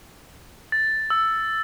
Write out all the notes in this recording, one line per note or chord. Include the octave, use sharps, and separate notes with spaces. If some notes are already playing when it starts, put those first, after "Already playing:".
A6
E6